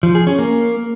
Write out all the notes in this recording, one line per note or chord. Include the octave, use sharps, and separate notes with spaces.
F3
G#4
C#4
A#3